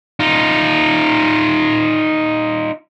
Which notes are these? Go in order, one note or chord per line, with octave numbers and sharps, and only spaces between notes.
D#4 F4